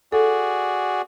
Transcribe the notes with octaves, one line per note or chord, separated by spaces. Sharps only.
F#4 G#4 A4 D5